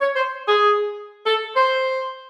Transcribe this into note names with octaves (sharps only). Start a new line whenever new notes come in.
C#5
C5
G#4
A4
C5